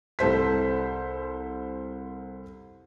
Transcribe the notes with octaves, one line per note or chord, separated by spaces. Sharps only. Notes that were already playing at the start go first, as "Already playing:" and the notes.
C2 A4 C5 B6